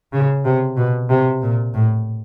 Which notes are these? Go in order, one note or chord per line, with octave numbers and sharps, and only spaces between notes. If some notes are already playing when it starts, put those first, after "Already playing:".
C#3
C3
B2
C3
A#2
A2